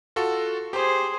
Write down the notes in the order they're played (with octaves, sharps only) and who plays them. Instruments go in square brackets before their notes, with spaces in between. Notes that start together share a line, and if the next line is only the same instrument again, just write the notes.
[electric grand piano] F4 F#4 A4
[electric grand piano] G4 [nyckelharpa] G#4 C5